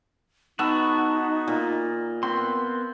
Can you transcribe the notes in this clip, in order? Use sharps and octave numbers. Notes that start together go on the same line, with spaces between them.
B3 D#4 F#4 A5 E6
A#2
B3 C4 A#4 C6